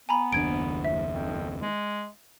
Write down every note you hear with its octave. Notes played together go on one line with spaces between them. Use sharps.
B3 G#5 A#5 B5
F#1 D#2 D4 G#6 D7
E5
F2
G#3